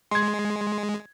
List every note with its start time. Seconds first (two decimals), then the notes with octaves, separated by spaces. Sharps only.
0.11 G#3 C6 G#6